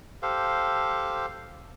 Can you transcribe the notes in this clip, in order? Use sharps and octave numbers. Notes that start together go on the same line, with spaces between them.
G4 A4 C5 F5